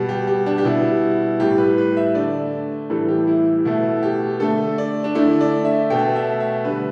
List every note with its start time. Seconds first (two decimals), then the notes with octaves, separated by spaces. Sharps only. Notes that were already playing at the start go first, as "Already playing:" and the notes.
Already playing: B2 G3
0.09 G4
0.27 G4
0.46 D4
0.58 G4
0.65 B2 G3 E4
1.40 A2 G3 G4
1.58 B4
1.78 B4
1.97 E5
2.15 D3 A3 D5
2.90 A2 E3 G3 A4
3.08 G4
3.27 E4
3.65 B2 A3 E4
4.03 G4
4.40 D3 A3 A4
4.78 D5
5.04 D4
5.15 D3 A3 E4
5.41 D5
5.65 E5
5.90 B2 A3 G5
6.16 E5
6.40 E5
6.65 D3 G3 B4